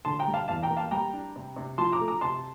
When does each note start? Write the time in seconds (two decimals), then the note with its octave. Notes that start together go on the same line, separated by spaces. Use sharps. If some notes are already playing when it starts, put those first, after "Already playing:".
0.05 D3 A5 C6
0.19 G5 A#5
0.27 G3
0.34 F5 A5
0.48 E2 F5 A5
0.63 G5 A#5
0.70 A#3
0.77 F5 A5
0.91 G3 G5 A#5
1.14 D4
1.36 C3
1.56 C3
1.78 F3 A5 C6
1.92 A#5 D6
2.00 A3
2.08 A#5 D6
2.21 C3 A5 C6